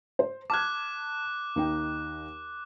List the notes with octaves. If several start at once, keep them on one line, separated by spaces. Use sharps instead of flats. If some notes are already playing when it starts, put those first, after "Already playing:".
C5
A5 D6 F6 F#6 G#6
D#2 D#4 G5